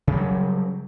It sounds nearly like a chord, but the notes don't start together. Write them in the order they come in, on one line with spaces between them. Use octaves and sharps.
C#3 G3 F#3